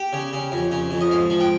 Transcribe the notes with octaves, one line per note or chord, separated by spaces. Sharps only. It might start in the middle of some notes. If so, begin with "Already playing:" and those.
Already playing: G4
C#3
C#3
F2
C#3
F2
D#5
G#2 F5
F3
G5